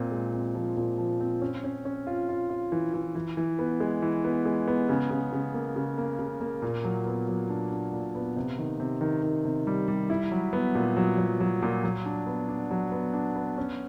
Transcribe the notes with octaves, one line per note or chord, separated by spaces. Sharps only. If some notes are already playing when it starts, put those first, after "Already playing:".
Already playing: A#2 C4
G#3
C4
F3
A#2
F3
C4
C#4
C#4
C#4
F4
F4
F4
E3
E3
E3
E3
B3
G#3
E3
B3
G#3
B3
C#3
C#3
C#3
A#3
C#3
A#3
C#3
A#3
A#2
F#3
B3
F#3
D4
D4
A#2
B3
C3
D#3
C3
D#3
D#3
C3
G3
G3
E4
F#3
B3
A#2
F#3
F#3
F#3
A#2
F#3
D4
B3
D4
F#3
B3
D4
B3
C#4